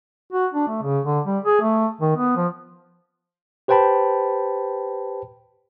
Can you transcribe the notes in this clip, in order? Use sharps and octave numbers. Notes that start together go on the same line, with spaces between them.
F#4
D4
A3
C#3
D3
G3
G#4
A3
D#3
B3
F3
G4 B4 C5 G5 A5 B5